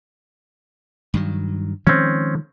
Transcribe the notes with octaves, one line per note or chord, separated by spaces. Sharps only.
G2 D#3 F#3
D#3 F3 G#3 C4 C#4